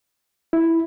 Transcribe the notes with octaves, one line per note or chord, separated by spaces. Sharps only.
E4